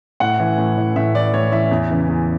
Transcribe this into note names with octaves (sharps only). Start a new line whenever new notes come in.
A2 F#5
E3
A2
E3
A2 E5
E3 D5
A2 C#5
E3 E5
E2
C#3 E3
E2